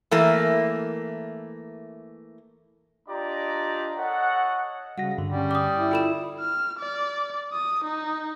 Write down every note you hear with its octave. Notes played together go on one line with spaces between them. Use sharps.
E3 A3 A#3
D4 F4 G4 D5 D#5 A#5
A4 C#5 D#5 F#5
C#3 G3 F#4 F#5 A#6
G2 D3
G3 C#4
D6 D#6
E4
F4 A4 G5 B5 E7
F6
D5
D#6
D#4